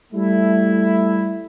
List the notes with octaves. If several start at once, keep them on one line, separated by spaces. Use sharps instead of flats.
G3 A3 E4